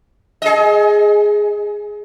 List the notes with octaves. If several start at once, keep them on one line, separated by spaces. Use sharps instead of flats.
G#4 D#5